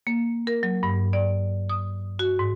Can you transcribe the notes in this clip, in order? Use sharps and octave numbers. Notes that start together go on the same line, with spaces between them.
A#3
A#4
F#3
G2
D5
D#6
F#4
G#2